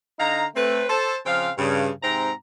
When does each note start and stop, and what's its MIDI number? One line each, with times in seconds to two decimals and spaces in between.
0.19 0.44 50
0.19 0.44 63
0.19 0.44 77
0.19 0.44 82
0.55 0.84 57
0.55 0.84 60
0.55 0.84 71
0.90 1.16 69
0.90 1.16 72
0.90 1.16 81
1.26 1.49 49
1.26 1.49 53
1.26 1.49 60
1.26 1.49 77
1.58 1.90 43
1.58 1.90 49
2.03 2.32 44
2.03 2.32 48
2.03 2.32 60
2.03 2.32 82